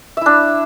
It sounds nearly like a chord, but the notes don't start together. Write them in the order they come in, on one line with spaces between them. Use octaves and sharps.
E5 E4 D4